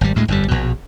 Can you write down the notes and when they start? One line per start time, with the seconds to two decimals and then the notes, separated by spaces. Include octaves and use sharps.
0.01 G#1 G3
0.15 D2 A2 G#3
0.28 G1 F2 B2 G3
0.48 A#1 B2